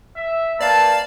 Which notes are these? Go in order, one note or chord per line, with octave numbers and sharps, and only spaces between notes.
E5
A#3 B4 D5 F5 A5